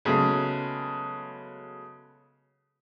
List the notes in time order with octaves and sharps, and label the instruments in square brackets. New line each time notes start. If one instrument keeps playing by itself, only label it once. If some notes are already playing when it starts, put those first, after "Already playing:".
[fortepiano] C#3 F#3 G#3 A3 B3